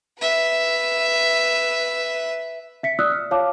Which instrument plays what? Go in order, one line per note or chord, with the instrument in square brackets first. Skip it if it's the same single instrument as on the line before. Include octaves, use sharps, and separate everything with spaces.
[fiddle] B4 E5
[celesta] E5 B6 C#7
D5 D#6 E6 F#6
F6
F4 C#5 F5 A5 D6